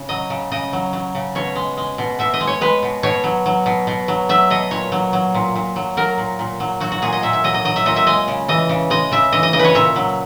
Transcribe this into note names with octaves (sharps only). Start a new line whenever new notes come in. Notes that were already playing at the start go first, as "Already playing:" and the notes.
Already playing: C#3
F#3 D#5
C#3
C#3 D#5
F#3
F#3
C#3
B2 C#5
G#3
G#3
B2
B2 E5
D#5
G#3
C#5
G#3 B4
B2
B2 C#5
F#3
F#3
B2
B2
F#3
F#3 E5
B2 D#5
A#2 C#5
F#3
F#3
A#2
A#2
F#3
F#3 A#4
A#2
A#2
F#3
F#3 F#4
F#4
A#2 G#4
D#5
A#2 E5
E5
F#3 D#5
D#5
F#3 D#5
E5
A#2 D#5
E5
G#3 D#5
C#3
E3 D#5
C#3
G#3 D#5
C#3 E5
E3 D#5
D#5
C#3 D#5
B4
C#5
A#2 E5
F#3